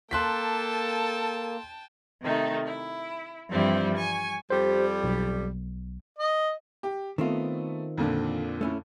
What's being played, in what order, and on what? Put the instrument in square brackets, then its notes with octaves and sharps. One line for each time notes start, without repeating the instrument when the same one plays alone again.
[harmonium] A#3 [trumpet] A4 [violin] G5 A5 [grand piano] C6 F#6 B6
[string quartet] C3 D#3 A3 D#4
E4
G2 E3 F3 G3 C4 E4
G#5 C#6
[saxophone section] F2 G3 [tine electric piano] G4 C5
[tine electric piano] B1
[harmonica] D#5
[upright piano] G4
[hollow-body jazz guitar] D#3 C4 F4 [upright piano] A3 B3
[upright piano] F2 A#2 D3
[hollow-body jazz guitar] A3 C#4 E4